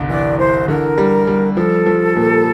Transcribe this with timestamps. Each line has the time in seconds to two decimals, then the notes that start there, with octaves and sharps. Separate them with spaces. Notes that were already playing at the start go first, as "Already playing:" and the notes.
Already playing: G1 C2
0.09 E3 D5
0.38 E3 C5
0.68 D3 A#4
0.98 G3
1.27 G3
1.57 F3 A4
1.86 F3
2.16 A#2